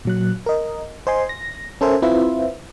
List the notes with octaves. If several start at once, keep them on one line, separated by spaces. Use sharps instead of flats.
A#2 F#3 F#6
A#4 D#5
C5 D#5 G#5 C6
A#6
C#4 A4 A#4 C5 E5 G#5
C4 E4 F4 B4 C5 E5